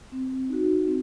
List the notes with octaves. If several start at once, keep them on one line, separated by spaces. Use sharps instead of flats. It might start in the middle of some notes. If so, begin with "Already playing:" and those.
C4
D#4 F#4
C4